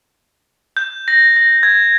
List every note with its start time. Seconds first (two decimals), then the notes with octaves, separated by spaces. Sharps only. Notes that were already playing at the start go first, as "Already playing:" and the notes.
0.77 G6
1.08 A#6
1.36 A#6
1.63 G#6